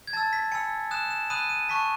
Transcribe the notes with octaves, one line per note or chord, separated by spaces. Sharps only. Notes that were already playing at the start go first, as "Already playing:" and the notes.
G#6
A5 E6 A6
B6
G#5 B5 E6 C#7
G#5 D#6 F#6 E7
E7
B5 D#6 F#6 D#7
D#7
A5 C#6 F#6 B6